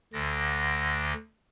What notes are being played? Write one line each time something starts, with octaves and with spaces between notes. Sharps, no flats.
D2 D3 A#6